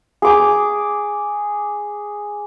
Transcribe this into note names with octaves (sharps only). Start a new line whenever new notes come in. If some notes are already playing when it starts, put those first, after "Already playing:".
G#4 D6